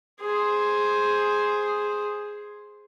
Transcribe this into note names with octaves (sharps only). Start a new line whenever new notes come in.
G#4 C5